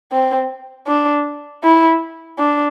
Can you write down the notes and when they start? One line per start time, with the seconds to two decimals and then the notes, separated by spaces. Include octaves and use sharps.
0.12 C4
0.87 D4
1.63 E4
2.39 D4